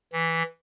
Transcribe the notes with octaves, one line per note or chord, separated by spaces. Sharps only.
E3